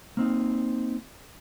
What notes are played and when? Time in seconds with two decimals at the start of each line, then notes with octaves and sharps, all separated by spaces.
0.17 A#3 C4 D#4